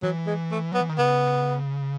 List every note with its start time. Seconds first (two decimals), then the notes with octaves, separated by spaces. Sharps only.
0.03 E3 F#3
0.27 G#3
0.51 A3
0.72 F#3 B3
0.81 E3
0.89 D#3
0.98 C#3 B3